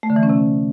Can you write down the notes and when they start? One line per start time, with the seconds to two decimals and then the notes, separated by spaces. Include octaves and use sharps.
0.03 A3
0.10 D3
0.16 E3
0.23 C#4
0.29 C3